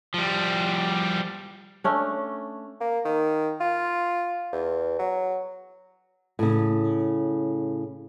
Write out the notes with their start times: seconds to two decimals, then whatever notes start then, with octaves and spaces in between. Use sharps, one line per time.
0.14 F3 G3
1.84 A3 C#4 D4
2.81 A#3
3.05 D#3
3.60 F4
4.52 E2
4.99 F#3
6.39 A2 C#3